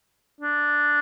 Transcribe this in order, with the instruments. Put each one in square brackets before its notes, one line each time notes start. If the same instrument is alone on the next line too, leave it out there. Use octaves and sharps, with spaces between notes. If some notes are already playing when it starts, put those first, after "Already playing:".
[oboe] D4